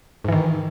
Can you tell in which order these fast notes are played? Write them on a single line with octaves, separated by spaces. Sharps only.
G#2 E3 D#3